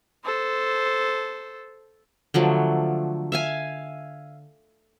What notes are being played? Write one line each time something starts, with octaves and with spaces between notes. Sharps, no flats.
A4 C5
D3 F3 F#3 A3
E5 F5 G#5